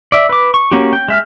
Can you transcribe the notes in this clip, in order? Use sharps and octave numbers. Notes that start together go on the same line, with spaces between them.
D5 E5
B4 D6
C#6
A#3 C#4 F#4 G4
G5
G#3 E5 F6